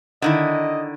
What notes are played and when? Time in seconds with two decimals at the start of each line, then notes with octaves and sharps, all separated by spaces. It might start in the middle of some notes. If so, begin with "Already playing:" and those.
0.22 D3 D#3 E4 D#5